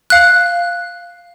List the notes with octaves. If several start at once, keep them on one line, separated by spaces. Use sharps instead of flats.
F5 F#6